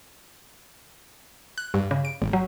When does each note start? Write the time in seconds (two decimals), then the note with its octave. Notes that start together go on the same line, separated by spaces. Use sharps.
1.58 F#6
1.74 G2
1.91 C#3
2.05 D7
2.22 G#1
2.33 F#3